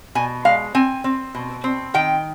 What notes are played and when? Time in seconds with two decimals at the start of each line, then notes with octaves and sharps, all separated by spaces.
0.15 B2 G#5
0.45 G#3 F5
0.75 C4 G#5
1.04 C4
1.35 B2
1.64 C4
1.94 D#3 G5